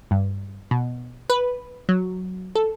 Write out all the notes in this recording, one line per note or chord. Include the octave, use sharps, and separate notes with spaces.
G2
B2
B4
F#3
A4